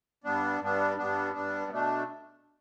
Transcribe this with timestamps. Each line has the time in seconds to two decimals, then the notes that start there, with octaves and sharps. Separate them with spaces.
0.24 G2 G3 B3 D4
0.60 G2 G3 B3 D4
0.97 G2 G3 B3 D4
1.34 G2 G3 B3 D4
1.70 B2 A3 D4